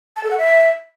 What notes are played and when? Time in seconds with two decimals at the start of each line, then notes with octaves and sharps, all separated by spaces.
0.16 A5
0.23 A4
0.31 F#5
0.38 E5